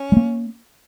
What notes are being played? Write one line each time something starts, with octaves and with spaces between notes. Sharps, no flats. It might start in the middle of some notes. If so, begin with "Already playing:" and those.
Already playing: C#4
G#3
A#3